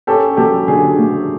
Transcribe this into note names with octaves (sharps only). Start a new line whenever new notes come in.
C#4 G4 A4
F#3 G4 A4
D3 G#4
A3